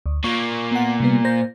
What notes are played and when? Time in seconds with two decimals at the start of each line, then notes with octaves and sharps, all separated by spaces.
0.06 D2
0.24 A#2 A#3 C#6
0.72 B3 F#5
1.00 C3 G3 B3
1.25 C5 G6 A#6